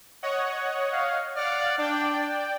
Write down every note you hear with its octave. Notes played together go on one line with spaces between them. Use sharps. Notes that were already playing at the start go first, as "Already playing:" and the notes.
C#5 D#5 F#5
F5
D5 F5 F#5 F6
D4 D5 G5